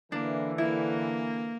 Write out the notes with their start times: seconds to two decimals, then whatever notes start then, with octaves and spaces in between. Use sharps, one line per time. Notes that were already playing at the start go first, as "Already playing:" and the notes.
0.12 D3 E3 A#3 D4
0.58 A#3 E4